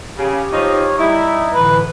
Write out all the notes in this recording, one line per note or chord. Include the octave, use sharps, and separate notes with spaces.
C#3 G4
F3 D#4 C#5
G3 D#4 E4
A2 D3 E3 B4